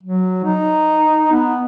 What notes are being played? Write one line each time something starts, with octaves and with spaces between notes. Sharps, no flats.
F#3
D#4
B3